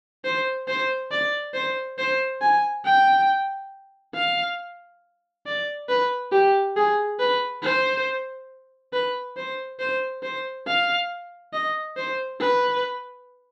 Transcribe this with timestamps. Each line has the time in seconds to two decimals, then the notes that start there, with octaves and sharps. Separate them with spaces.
0.25 C5
0.68 C5
1.11 D5
1.54 C5
1.99 C5
2.41 G#5
2.85 G5
4.15 F5
5.46 D5
5.89 B4
6.32 G4
6.76 G#4
7.19 B4
7.62 C5
8.93 B4
9.37 C5
9.79 C5
10.23 C5
10.67 F5
11.53 D#5
11.97 C5
12.40 B4